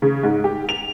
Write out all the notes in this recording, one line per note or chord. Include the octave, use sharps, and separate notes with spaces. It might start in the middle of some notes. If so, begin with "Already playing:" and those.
C#3
G#2
G4
F7